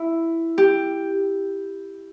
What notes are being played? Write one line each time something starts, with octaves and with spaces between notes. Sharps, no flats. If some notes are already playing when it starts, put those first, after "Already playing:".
Already playing: E4
G4